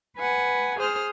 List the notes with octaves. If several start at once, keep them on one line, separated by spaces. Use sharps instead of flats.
B4 F#5 G#5
G#4 C5 D#6 F6